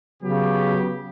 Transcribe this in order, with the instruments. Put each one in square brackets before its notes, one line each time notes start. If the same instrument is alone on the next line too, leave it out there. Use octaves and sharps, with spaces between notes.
[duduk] C#3 [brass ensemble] F#3 B3 G4